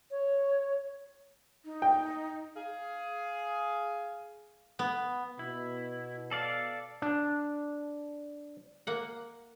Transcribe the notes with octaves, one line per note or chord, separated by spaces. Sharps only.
C#5
D#4
G5
G#4 F5
B3
B2 E4
A4 D5 F5
D4
A#3 F#5